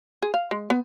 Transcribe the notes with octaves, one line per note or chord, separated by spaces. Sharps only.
G#4
F5
G#3
B3